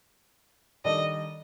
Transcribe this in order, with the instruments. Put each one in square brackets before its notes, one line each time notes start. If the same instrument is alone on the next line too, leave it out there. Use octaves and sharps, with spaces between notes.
[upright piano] D#3 G3 D4 A4 D5 [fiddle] D#5